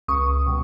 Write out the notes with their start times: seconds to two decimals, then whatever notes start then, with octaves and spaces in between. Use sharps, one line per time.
0.08 C#2 C#6 D#6
0.46 B2 G3